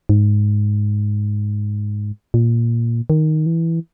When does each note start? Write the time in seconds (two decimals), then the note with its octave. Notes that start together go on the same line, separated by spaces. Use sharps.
0.09 G#2
2.34 A#2
3.10 D#3
3.46 E3